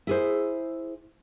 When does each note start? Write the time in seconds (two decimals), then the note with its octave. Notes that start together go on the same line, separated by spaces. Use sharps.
0.07 E4 G#4 C5